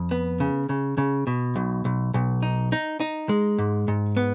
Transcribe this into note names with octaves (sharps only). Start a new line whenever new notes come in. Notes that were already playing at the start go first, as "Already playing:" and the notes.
Already playing: F2
B3
C#3
C#3
C#3
B2
B1
B1
B1
D#4
D#4
D#4
G#3
G#2
G#2
B3